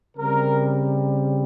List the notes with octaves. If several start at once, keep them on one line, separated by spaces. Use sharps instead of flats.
C#3 G3 C4 A#4